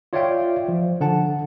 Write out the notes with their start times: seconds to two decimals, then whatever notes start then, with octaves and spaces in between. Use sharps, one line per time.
0.13 F4 C#5 D5 E5 F5 G5
0.68 F3
1.01 D3 F#5 A5